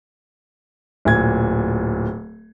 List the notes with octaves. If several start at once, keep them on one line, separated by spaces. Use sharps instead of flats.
D1 A#2 G#6